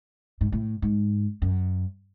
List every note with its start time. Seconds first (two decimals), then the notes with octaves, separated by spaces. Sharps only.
0.41 G#2
0.52 A2
0.82 G#2
1.42 F#2